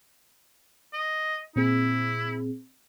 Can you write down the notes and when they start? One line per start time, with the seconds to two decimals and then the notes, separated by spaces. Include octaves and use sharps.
0.93 D#5
1.56 A#2 C4 E4 G#4